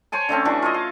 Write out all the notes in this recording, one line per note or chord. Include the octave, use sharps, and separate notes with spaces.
C5 C#5 G#5 A5
D3 A3 C4 C#4
E3 D4 F#4 C#6
F4 C#5 D#5
F5